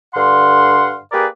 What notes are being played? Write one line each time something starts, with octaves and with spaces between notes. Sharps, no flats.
G2 D3 F5 F#5 C6
A#3 G4 G#4 A#4 B4 D5